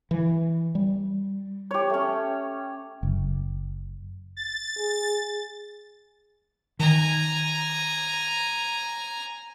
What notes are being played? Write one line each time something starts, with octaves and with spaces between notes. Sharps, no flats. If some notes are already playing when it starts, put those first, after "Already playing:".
E3
G3
G4 C#5
A3 C#4
F#1
A6
G#4
D#3 G#5 A#5